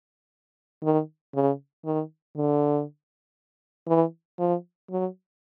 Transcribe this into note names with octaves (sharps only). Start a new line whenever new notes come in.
D#3
C#3
D#3
D3
E3
F3
F#3